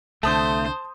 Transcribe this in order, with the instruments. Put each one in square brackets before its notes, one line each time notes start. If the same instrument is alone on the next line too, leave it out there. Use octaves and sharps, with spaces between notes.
[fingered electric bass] C2 D3 [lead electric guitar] A3 [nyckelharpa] C5 [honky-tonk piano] A5 D#6 G6